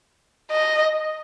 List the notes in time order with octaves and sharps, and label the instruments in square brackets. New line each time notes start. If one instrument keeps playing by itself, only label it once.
[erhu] D#5